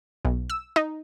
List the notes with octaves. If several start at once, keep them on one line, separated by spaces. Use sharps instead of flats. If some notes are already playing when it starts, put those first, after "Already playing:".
B1
E6
D#4